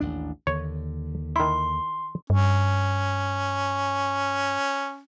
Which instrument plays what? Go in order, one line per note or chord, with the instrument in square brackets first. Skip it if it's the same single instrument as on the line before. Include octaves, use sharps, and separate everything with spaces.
[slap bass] A1 D#2 D4
[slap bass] D#2 D3 [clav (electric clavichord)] C#5
[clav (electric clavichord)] D#3 E4 [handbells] C6
[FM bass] G2 [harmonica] C#4